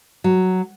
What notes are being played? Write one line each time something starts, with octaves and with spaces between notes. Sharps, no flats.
F#3